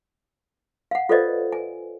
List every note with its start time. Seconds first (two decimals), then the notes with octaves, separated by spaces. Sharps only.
0.91 F5 F#5
1.09 F4 A4 B4 C5 D5 D#5
1.52 G#5